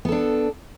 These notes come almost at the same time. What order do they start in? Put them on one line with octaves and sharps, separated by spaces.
B3 A4 D4